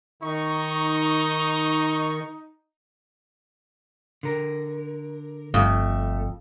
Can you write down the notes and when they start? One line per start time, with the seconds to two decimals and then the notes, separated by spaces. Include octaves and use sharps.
0.22 D#3 D#4 C#6
4.23 D3 A#4
5.54 G1 F2 A3